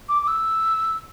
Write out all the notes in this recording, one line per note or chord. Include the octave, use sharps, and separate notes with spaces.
D6
D6
E6